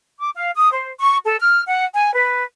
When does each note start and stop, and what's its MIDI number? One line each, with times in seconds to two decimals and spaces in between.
0.20 0.30 86
0.35 0.51 77
0.56 0.71 87
0.73 0.90 72
1.00 1.16 85
1.24 1.38 69
1.40 1.63 89
1.67 1.83 78
1.94 2.13 80
2.15 2.44 71